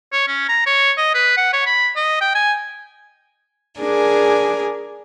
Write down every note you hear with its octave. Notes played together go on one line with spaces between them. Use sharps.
C#5
C#4
A#5
C#5
D#5
B4
F#5
C#5
B5
D#5
G5
G#5
D4 G#4 A#4 G#5